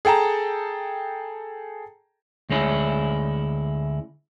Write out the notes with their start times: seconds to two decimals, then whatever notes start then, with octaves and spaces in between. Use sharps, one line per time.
0.05 G#4 A4 G5 A5 A#5
2.50 D2 G#3 C#4 E4